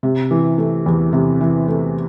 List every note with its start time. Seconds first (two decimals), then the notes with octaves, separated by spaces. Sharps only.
0.03 C3
0.31 E3
0.58 A3
0.86 E2
1.13 C3
1.41 E3
1.68 A3